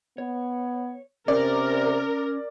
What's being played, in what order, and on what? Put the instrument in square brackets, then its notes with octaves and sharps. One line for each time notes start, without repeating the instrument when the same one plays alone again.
[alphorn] B3 [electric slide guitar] C#5
[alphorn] C3 [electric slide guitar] C#4 C#5 [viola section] A#4 [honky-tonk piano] D5